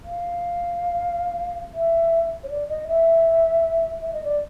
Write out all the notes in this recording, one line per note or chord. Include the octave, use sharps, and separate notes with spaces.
F5
E5
C#5
D5
D#5
E5
E5
D#5
D5